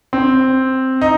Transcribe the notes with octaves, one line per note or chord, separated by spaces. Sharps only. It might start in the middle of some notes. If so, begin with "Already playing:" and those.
C4
D#4